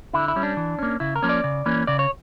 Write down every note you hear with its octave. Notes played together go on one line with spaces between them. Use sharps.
D3 E4
E4
G3 C#4
D4
E3
A#3 C#4
C#3 E4
A#4
F3 A#3 C#4
D5
C#3
E3 A#3 C#4
C#3 D5
C#5